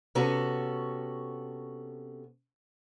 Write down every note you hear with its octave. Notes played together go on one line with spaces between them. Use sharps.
C3 B3 C#4 F#4 A4 A#5